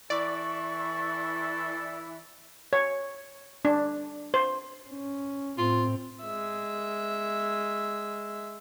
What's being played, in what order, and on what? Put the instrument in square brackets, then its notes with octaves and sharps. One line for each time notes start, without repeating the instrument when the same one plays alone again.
[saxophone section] E3 E4 [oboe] A4 [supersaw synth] D5 [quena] C#6
[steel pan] C#5
D4
C5
[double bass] C#4
[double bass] A2 C4 [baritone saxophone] F4
[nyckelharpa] G#3 E5